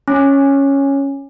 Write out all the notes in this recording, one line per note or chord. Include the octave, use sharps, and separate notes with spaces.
C#4